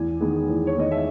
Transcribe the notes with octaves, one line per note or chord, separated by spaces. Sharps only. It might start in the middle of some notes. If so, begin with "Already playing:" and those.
Already playing: E2 G#5
D#3 G#3 B3
E2
C#5
D#3 G#3 B3 D#5
E5